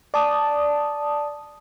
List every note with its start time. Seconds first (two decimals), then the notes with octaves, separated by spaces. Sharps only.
0.14 D5 A5 D#6